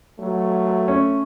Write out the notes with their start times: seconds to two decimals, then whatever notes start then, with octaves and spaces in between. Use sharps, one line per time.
0.19 F#3 A3
0.88 C#4